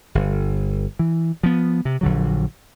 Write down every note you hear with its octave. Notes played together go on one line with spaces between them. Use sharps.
G1
E3
F3 B3
C3
A#1 D3 F#3